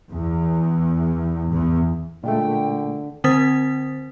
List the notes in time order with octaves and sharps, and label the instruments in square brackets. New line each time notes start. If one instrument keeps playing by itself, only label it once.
[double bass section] E2
E2
[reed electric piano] A#2 G#3 A3 [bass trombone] D3 [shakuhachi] G5
[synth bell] D3 C4 C5 D#6 A6 B6